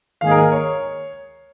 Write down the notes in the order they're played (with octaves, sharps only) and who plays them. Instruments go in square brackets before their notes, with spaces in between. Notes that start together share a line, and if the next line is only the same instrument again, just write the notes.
[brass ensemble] G#2 D#3 A#3 D#4 G#4 [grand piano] F5
[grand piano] A#4
A#4
C#5